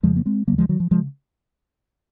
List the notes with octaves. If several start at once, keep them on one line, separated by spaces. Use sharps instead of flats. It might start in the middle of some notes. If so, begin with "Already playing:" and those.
F2 C#3 F3 G#3
A#3
G#3 C4
D#2 C#3 F#3 A#3
F3 G#3
D#3 F#3
F3
C#3 F3 G#3